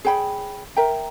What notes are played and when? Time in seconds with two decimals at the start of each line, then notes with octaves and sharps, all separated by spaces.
0.05 G#4 C#5 G5 B5
0.76 A#4 E5 G5 A#5